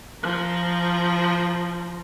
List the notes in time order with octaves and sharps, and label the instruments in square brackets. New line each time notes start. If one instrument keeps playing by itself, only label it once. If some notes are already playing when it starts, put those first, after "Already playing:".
[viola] F3 A#5